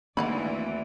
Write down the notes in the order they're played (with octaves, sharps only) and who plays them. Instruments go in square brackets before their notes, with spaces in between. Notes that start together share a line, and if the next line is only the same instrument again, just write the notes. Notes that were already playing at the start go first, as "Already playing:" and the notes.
[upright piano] G#1 [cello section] D2 E3 D5 [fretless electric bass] A#3 [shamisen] F5 F#5 B5